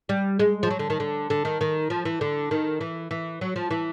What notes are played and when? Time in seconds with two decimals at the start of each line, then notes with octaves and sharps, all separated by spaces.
0.09 G3
0.39 G#3
0.63 F3
0.70 F#3
0.79 D3
0.90 D#3
1.00 D3
1.30 D3
1.45 D#3
1.61 D#3
1.90 F3
2.05 E3
2.21 D3
2.51 D#3
2.81 E3
3.11 E3
3.41 F#3
3.56 F3
3.70 E3